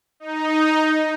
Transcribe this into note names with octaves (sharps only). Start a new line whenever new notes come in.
D#4